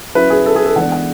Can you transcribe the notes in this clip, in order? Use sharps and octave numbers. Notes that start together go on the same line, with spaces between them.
F#3 C#4 E4 B4
G#4
A4
G#4
A4
E3 G#3 B3 D4 F#5
F#5